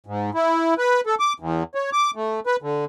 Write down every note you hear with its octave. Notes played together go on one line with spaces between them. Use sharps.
G#2
E4
B4
A4
D6
E2
C#5
D6
A3
B4
D3